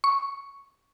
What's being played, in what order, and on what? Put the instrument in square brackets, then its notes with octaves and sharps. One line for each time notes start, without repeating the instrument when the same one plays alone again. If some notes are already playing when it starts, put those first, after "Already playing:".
[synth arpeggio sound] C#6